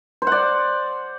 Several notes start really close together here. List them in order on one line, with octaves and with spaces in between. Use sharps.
C5 F#5 D5